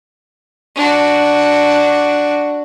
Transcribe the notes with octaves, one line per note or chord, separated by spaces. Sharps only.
D4 F#4